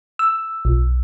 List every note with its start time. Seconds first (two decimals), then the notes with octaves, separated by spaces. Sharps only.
0.19 E6
0.65 B1